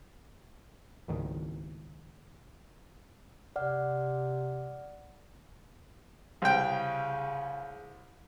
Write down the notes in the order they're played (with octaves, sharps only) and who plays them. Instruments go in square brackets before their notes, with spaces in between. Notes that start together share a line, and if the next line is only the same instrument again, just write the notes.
[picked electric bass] C#2 G#2 D#3
[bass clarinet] C3 [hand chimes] D5 F#5 F6
[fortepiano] C2 G5 [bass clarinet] C#3